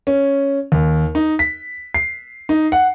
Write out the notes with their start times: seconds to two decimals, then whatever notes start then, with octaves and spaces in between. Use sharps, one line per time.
0.07 C#4
0.72 D#2
1.15 D#4
1.39 B6
1.94 C7
2.49 D#4
2.72 F#5